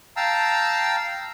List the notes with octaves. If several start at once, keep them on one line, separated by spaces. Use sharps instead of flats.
F5 G5 A5 A#5 E6